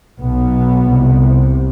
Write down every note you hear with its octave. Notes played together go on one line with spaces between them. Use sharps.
B1 B2 B3
C2 C3